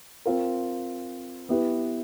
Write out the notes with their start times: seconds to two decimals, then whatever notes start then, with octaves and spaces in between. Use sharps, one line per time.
0.26 C4 F4 A#4
1.49 B3 E4 G4 B4